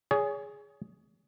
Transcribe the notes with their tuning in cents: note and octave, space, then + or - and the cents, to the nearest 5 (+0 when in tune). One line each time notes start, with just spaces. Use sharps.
G#4 +0 C#5 +35